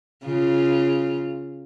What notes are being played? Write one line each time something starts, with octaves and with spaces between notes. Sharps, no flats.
C#3 F4